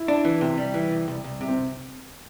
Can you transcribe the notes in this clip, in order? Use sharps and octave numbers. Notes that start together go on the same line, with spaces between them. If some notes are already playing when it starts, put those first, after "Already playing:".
Already playing: E4
D4
E3
C3
G3
E3
C2
C2
C2
C3
C4